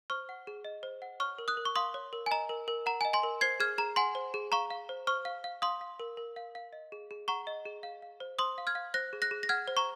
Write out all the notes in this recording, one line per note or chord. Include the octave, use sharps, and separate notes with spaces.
C5 C#6 F6
F#5
G#4
D#5
C5
F#5
C#5 C#6 F6
A#4
D#6 F#6
A#4
C#6
F5 C6 D#6
C#5
A#4
G#5
D#5 A#5
A#4
A#4
F#5 A#5
G#5
D#5
G#5 C6
A#4
C5 G#6 C7
G#4 F6 G#6
G#4 A#5
F#5 G#5 C6
C5
G#4
F5 A#5 C#6
F5
C5
C5 C#6 F6
F5
F5
F5 C6 D#6
F5
A#4
A#4
F5
F5
D#5
G#4
G#4
F#5 A#5 C#6
D#5
G#4
F5
F5
C5
C5 C6 D#6
F5
F6 G#6
F5
C5 F#6 A#6
G#4
F#6 A#6
G#4
A#6
F#5 F6 G#6
C5
A#5 C#6